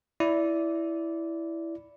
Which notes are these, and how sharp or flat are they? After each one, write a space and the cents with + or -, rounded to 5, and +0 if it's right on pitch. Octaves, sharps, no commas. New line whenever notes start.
E4 +0 D5 -15